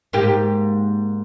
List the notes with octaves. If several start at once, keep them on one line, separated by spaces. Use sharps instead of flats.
G#2 A#3 G4